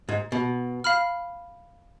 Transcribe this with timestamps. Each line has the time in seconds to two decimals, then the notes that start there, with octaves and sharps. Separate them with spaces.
0.09 G#2
0.32 B2
0.84 F5 B5 F6